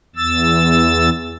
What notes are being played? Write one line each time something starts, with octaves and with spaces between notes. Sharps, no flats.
E2 E6 A6